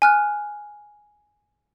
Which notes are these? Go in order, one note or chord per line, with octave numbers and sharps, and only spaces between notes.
G#5 F6 F#6